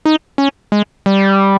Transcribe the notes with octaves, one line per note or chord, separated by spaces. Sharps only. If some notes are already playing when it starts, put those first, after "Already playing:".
D#4
C#4
G#3
G3